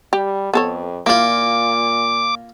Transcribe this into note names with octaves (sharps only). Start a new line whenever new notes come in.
G3 G4
F2 B3 A4 C#5
A#2 A#3 E4 F4 D5 D6